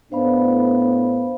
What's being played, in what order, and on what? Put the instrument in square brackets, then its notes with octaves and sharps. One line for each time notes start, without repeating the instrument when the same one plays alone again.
[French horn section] A2 B3 D4 [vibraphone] C5 F5 B5